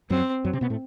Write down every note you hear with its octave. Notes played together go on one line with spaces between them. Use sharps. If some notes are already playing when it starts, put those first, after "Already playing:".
F#2 F#3 C4
F#2 F#3
C3 C4
B2 B3
A2 A3